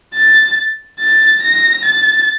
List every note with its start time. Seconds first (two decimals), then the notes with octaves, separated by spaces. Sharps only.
0.15 A6
1.00 A6
1.43 A#6
1.86 A6